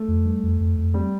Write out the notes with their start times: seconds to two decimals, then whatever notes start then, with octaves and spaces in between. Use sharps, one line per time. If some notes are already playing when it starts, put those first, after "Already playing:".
Already playing: A3
0.08 F2
0.25 G3
0.43 F2
0.60 F2
0.78 F2
0.94 G3 C4